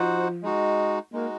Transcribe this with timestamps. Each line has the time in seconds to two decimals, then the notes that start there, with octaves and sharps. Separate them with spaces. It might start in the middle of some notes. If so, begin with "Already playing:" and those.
Already playing: F3 D#4 F#4 C5 F#5
0.43 G#3 D#4 F#4
1.13 G#3 A#3 D#4 F#4